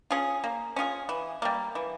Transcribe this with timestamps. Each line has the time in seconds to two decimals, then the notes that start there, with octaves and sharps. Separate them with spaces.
0.11 C#4 F4 G#4
0.44 A#3
0.76 C#4 F4 G#4
1.09 E3
1.42 G3 A#3
1.75 E3